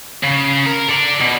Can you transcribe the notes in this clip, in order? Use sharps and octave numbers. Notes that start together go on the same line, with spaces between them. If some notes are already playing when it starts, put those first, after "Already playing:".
C#3
A#4
A4 D5
B2